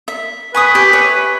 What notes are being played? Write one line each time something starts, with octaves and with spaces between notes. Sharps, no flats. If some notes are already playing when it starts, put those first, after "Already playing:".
E5
B4 G#5 C#6 D#6
G4 G5 G#5
C#5 E5